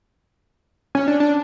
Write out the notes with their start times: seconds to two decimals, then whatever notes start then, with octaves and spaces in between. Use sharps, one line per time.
0.95 C#4
1.08 D4
1.20 D4